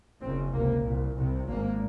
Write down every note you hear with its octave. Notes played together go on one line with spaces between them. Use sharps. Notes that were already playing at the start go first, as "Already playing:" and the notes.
F#1 F#2 C#3 C4
C#2 C3 A#3
C2 A#2
C2 C3
G#1 G#2 A#3